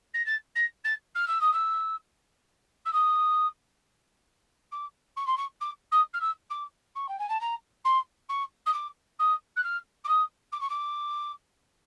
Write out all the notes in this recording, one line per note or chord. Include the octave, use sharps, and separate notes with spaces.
A#6
A6
A#6
A6
F6
E6
D#6
E6
E6
D#6
D6
C#6
C6
C#6
D6
D#6
F6
E6
D6
C#6
G5
G#5
A5
A#5
C6
C#6
D#6
D6
D#6
F#6
F6
D6
D#6
D6
C#6
D6